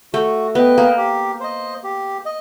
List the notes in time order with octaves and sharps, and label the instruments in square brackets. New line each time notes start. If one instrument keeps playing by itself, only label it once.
[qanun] A3 [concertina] F#4
[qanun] B3 [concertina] B4 D#5 G5
[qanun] A#3
[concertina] G4
C5 D#5
G4
D#5